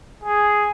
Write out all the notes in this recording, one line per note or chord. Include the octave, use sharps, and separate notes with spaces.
G#4